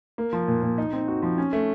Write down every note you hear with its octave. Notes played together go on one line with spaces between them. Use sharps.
A#3
F3
A#2
A#2
D#4
C4
F#4
F3
C#4
A3